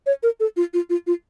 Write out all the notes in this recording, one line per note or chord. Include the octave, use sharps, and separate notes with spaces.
C#5
A#4
A4
F4
F4
F4
F4